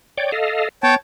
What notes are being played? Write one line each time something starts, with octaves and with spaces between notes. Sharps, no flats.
C#5 D5 G5
A4 D#5 F5
B3 C#5 G5 A5